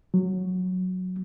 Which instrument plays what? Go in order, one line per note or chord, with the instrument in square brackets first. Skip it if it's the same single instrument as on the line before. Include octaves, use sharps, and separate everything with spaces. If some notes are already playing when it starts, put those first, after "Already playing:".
[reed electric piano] F#3